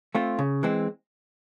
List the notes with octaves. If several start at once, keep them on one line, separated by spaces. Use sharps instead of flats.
A3 C4 F4
C#3
E3 G#3 C4